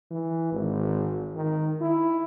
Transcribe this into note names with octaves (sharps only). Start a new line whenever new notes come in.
E3
G#1
D#3
E4